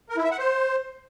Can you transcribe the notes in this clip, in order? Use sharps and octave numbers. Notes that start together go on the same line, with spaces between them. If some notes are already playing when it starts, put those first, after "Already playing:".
A#4
E4
E5
F#5
C5